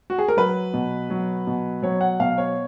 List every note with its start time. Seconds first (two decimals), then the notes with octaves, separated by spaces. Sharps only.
0.10 F#4
0.19 G#4
0.28 A#4
0.37 F#3 B4
0.74 B2
1.10 F#3
1.47 B2
1.82 F#3 C#5
2.01 F#5
2.20 B2 F5
2.38 C#5